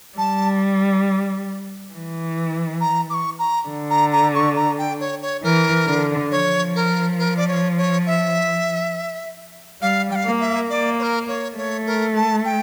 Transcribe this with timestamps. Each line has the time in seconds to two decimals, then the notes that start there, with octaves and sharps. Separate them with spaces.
0.18 G3 A5
1.93 E3
2.81 A#5
3.10 D6
3.14 C#6
3.39 A#5
3.68 D3
3.90 A#5
4.12 A#5
4.35 C#6
4.56 A#5
4.78 G5
5.00 C#5
5.22 C#5
5.43 E3 A#4
5.87 D3
6.31 F3 C#5
6.75 A#4
7.19 A#4
7.37 D5
7.48 C#5
7.77 C#5
8.06 E5
9.82 G3 F5
10.11 G5
10.15 F5
10.26 A#3
10.40 E5
10.69 A#3 D5
10.99 C#5
11.02 A#4
11.28 C#5
11.57 A3 C#5
11.86 A#4
12.16 A5
12.45 G5